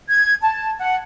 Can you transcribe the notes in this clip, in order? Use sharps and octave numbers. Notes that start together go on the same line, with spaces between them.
G#6
A5
F#5